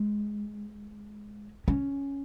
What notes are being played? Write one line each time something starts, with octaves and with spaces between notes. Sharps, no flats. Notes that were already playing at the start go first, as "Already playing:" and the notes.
Already playing: G#3
C#4